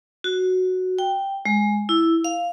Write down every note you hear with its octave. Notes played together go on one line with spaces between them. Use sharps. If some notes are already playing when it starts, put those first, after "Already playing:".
F#4
G5
G#3
E4
F5